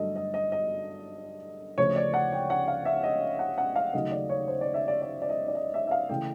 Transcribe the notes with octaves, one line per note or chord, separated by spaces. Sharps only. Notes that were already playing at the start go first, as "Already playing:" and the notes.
Already playing: G2 D3 F#3 A3 A4 D#5
D#5
D#5
D#5
D2 C#3 F3 A3 C#5
D5
F#5
G5
F#5
F5
E5
D#5
F#5
F#5
F5
D#2 C#3 F#3 A3 D#5
D5
C#5
C5
D5
E5
D5
D5
D5
D#5
D5
D#5
E5
E5
F5
C#3 E3 A3 G5